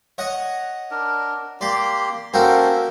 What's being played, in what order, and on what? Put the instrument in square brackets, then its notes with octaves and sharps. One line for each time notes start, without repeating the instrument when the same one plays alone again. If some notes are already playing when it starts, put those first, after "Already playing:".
[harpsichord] C#5 D#5 F#5
[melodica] D4 A#4
[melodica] A#3 G4 C6 [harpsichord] D5
[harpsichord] A#3 F#4 G4 [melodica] C#4 A4 C5